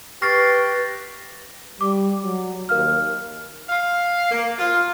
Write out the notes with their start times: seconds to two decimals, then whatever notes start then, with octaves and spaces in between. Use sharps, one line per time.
0.22 G4 B4 C#6 F6 A6 A#6 C7
1.81 G3 D6
2.23 F#3
2.69 D#2 A#4 F5 F6
3.69 F5
4.31 A#3
4.59 F4